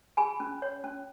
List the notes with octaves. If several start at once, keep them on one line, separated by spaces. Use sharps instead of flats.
G#4 G#5 B5
C#4
C#5
C#4